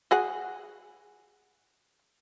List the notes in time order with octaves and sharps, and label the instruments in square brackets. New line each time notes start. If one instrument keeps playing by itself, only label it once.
[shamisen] F#4 G#4 F#5